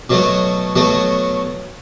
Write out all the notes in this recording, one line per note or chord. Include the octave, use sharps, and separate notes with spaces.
B2 F#3 A3
B2 F#3 A3